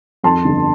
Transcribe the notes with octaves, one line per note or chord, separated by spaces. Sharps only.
F2 A5 C6
G1